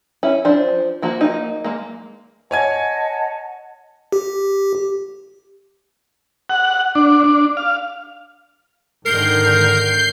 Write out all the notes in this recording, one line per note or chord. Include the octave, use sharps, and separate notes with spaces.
C#4 E4
F3 D4 C5
F3 A#3 F#4
A#3 D#4
G#3 A#3
C#5 D#5 F#5 G#5 A5 G#6
G4
F#5
D4
D4
F5
G#2 D3 D#3 A#4 G6 C7